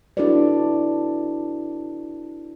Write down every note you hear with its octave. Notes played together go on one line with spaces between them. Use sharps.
D4 E4 F#4 A4 B4 D5